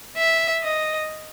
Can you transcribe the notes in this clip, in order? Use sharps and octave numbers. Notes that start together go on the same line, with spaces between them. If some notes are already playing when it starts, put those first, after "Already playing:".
E5
D#5